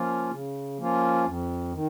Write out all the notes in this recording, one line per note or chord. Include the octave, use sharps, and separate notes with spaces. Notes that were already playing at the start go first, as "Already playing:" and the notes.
Already playing: F3 A#3 C#4 F4
C#3
F3 A#3 C#4 F4
F2
D#3